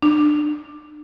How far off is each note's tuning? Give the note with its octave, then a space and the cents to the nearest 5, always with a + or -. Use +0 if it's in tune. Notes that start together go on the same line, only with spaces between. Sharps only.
D4 +30